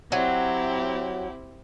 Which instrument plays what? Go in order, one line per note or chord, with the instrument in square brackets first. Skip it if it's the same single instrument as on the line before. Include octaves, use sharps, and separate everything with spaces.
[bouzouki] F#3 [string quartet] C4 E4 G4